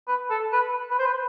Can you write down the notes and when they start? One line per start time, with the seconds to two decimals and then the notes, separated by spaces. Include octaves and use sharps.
0.08 B4
0.30 A4
0.53 B4
0.91 B4
0.99 C5
1.06 B4